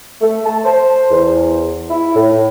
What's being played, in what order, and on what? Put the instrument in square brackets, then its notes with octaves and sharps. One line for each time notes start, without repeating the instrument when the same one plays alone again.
[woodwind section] A3
A5
C5
E2
E4
A2